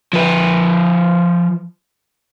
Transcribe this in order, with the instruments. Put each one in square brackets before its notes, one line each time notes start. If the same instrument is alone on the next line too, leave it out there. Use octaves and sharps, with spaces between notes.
[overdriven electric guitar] F3 B4